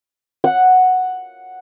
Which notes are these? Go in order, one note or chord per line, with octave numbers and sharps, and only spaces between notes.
F#5